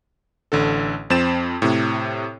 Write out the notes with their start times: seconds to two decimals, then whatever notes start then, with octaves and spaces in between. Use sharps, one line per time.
0.52 A1 D3 A4
1.10 F2 C4 A6 E7
1.62 A2 C3